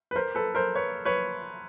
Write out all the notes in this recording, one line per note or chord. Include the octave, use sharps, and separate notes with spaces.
B4
A#4 C5
A4 B4
A#4 C5
B4 C#5
B4 C#5